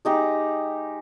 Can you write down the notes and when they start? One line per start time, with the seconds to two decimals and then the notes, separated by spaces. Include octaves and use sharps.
0.05 G#3 D#4 G4